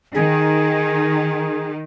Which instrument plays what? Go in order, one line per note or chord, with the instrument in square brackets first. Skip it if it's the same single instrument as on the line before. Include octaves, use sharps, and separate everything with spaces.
[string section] D#3 [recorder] G#4